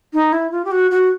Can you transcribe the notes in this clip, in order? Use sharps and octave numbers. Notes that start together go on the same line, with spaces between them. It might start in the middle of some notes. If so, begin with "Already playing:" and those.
D#4
E4
F4
G4
F#4
F#4